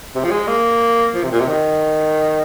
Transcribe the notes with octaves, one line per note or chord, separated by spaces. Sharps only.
C3
F3
G#3
A#3
F3
C3
A#2
C3
D#3